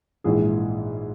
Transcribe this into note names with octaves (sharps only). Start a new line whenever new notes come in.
A#1 G#2 E3 G#4